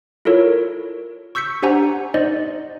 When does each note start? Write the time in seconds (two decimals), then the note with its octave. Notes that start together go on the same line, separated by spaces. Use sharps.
0.25 E4 F4 A4 A#4 C#5
1.35 C#6 E6 G6 B6 C#7
1.62 D4 G4 C5 F#5 G#5 A#5
2.14 D#4 C5 D5 D#5